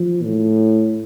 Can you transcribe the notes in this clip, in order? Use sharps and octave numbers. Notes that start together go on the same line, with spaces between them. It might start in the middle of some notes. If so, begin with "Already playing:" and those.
Already playing: F3
A2